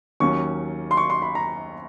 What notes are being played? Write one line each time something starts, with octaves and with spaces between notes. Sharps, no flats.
D#2 D#3 F#3 A#3 C#4 C#6
C6
C#6
C6
B5
A#5